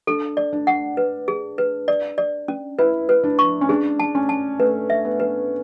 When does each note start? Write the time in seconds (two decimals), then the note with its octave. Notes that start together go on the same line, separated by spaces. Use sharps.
0.07 D4 A4
0.37 D5
0.53 D4
0.67 F#5
0.97 B4
1.28 G#4
1.58 B4
1.88 D5
2.18 D5
2.48 C#4
2.79 E4 B4
3.09 B4
3.24 D4
3.39 C#6
3.61 C#4
3.69 D4 G#4
4.00 A5
4.15 C#4
4.29 A5
4.59 A3 B4
4.90 E5
5.05 B3
5.20 B4